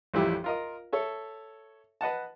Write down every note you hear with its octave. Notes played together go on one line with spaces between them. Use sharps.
A1 F2 G3 E4 G4
F4 A#4 D#5
A4 C#5 E5
B4 D#5 F#5 A5